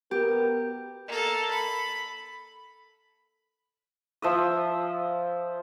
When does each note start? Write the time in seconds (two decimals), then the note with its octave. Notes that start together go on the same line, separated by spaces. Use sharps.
0.11 B3 G4 A#4
1.08 A#3 A4
1.50 B5
4.22 F3 E5 D#6